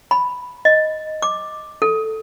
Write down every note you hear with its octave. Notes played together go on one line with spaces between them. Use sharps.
B5
D#5
D6
A4